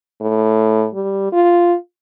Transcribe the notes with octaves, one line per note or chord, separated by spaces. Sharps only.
A2
G3
F4